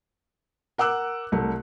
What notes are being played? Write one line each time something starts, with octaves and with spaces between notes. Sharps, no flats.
A#4 F#5 D6 E6 F#6
C2 A3